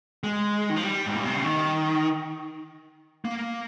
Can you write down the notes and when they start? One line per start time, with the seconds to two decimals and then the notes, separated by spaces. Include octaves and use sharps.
0.23 G#3
0.70 D#3
0.76 F3
0.83 G3
1.06 G#2
1.15 A#2
1.25 C3
1.35 C#3
1.44 D#3
3.25 A#3